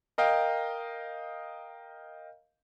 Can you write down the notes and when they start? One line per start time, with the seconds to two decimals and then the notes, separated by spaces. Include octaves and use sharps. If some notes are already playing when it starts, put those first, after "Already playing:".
0.18 A#4 D#5 F5 G5